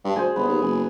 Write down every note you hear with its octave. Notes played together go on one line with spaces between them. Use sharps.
G2
D2 G#4 C5
G1 B3
D#2
F#1 G#5